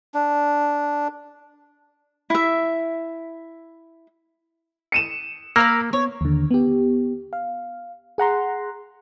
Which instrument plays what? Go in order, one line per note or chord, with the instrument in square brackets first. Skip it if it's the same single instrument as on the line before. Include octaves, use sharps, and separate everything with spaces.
[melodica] D4
[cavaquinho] E4 E5
[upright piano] C#7 D#7 E7
[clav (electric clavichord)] A#3 [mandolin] A#4 F5 B5 [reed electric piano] E6
[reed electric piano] B3 [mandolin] C#5
[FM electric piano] D#2 D3
B3 G4
F5
G#4 F#5 A#5 C6